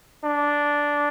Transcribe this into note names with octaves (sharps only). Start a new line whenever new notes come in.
D4